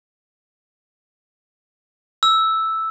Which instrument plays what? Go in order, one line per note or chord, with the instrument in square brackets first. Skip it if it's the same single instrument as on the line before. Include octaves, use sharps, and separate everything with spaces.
[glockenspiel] E6